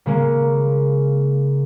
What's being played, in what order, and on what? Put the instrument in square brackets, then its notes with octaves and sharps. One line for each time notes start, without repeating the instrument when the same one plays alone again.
[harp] C#3 G#3 A#3 C#4